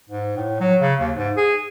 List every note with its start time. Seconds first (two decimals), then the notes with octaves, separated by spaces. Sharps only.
0.09 G#2
0.36 A2
0.60 F#3
0.81 C#3
0.99 D#2
1.17 G#2
1.37 G#4